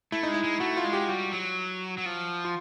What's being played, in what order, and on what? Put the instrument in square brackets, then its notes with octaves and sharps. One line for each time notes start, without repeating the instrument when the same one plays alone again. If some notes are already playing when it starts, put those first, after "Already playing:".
[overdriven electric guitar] A3 [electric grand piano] E4
[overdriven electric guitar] G#3 [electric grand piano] D#4
[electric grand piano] E4
[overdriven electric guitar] G#3
[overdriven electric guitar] A3 [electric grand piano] F#4
[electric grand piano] F4
[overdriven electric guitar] G#3
[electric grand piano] G4
[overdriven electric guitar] G3 [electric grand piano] F#4
[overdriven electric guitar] F#3
F#3
F3
[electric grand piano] F4